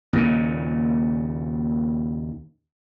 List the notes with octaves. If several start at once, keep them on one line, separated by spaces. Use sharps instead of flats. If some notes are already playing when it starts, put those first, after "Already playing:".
D#2 A#2 C#3